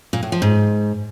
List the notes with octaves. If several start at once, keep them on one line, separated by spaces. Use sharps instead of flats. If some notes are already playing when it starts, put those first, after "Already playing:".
A#2
A2
F3
G#2